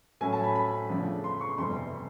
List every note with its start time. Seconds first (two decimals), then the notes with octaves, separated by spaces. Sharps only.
0.21 A2 F#3 A3 C#4 G#5
0.33 A5
0.44 B5
0.56 B5
0.89 E2 C#3 F3 A3 D4
1.24 C6
1.41 C#6
1.58 G1 F2 C3 E3 G3 C6